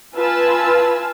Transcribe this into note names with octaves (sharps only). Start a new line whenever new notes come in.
F4 B4 G#5 A5 E6